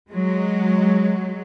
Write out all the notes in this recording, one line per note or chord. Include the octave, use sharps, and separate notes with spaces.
F#3 G#3